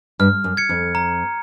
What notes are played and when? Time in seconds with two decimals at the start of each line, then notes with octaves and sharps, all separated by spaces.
0.19 G2 F6
0.44 F#2
0.57 G#6 C#7
0.69 F2
0.95 A#5